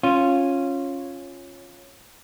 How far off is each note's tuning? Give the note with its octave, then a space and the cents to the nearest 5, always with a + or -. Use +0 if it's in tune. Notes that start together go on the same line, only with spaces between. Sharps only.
C#4 -10 F4 +5